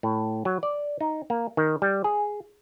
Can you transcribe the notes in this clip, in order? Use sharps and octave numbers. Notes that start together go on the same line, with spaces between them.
A2
F#3
D5
D#4
A#3
D#3
G3
G#4